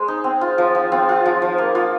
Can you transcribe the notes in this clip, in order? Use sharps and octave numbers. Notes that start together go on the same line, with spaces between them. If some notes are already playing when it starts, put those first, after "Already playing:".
Already playing: G#3 G#4 C5
D#4
C4
F4
F3
F3
C4 F4
F4
F3
F3
A#3
F4